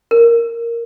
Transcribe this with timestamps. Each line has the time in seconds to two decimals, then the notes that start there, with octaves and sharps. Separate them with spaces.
0.11 A#4